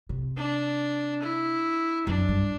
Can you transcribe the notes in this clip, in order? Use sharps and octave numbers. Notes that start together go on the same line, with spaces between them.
C3
D4
E4
F#2 D4
G2